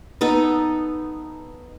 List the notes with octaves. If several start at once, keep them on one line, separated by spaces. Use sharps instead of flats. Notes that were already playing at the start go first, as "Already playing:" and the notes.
B3 D#4 A4